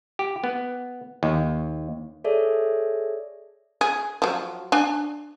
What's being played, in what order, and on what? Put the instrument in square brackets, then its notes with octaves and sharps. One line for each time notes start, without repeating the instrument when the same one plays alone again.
[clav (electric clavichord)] G4
B3
D#2
[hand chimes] G#4 A4 C#5 D5 E5
[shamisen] G#4
F3 F#3
D4 G#5